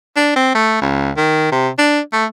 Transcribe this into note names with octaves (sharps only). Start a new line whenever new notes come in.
D4
C4
A3
C#2
D#3
C3
D4
A3